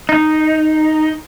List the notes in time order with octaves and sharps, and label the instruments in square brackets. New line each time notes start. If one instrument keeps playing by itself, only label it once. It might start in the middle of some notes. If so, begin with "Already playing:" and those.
[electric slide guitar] D#4